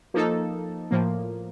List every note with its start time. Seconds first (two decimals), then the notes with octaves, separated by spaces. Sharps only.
0.14 F3 A#3 D#4 A4
0.91 A2 F3 A#3